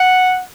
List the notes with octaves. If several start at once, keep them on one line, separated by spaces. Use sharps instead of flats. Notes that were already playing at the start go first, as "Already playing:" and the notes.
Already playing: F#5